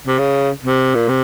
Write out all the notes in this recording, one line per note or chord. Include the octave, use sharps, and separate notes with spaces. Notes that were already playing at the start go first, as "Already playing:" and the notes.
C3
C#3
C3
A#2
C3